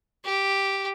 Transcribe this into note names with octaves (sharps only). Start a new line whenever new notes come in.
G4